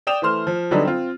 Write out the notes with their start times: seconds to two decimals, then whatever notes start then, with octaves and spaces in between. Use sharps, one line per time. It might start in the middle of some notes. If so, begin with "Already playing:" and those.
0.07 D5 G5 D#6 E7 F7
0.22 E3 A3 C5 C6 F6
0.47 F3
0.71 D3 F#3 G3 B3 D4 D#4
0.85 C4 F4